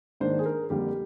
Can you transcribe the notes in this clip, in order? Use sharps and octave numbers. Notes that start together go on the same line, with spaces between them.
G#2 D#3 A#3 D4 C5
G#4
A#4
F2 D3 G3 A#3 G4